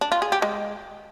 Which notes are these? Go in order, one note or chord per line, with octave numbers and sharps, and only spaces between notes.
D4
F4
G#4
G4
G#3